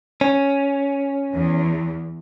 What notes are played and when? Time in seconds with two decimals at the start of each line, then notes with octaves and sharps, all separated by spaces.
0.21 C#4
1.34 E2